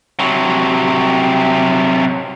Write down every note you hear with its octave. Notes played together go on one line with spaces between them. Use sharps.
C3 F#3